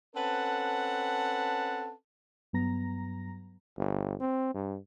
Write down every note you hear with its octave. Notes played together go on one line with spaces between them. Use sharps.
C4 C#4 A4 B4 F#5 A5
G2 F#3 B3 A#5 A#6
G1
C4
G2